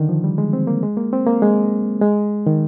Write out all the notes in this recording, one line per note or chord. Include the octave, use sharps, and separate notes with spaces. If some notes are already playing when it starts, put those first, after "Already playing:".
Already playing: D3 D#3
F3
G3
G#3
C4
A#3
G#3
A#3
C4
A#3
G#3
G#3
D#3